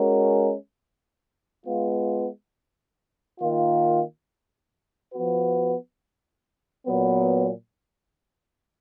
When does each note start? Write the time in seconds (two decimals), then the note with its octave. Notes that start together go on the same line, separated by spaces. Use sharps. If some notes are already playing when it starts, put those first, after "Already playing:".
Already playing: G#3 C#4 F#4 A#4
1.66 G#3 B3 F4
3.39 D#3 A#3 F4
5.13 F3 B3 F#4 B4
6.87 A#2 F#3 B3